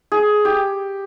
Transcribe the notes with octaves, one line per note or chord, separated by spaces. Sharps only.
G#4
G4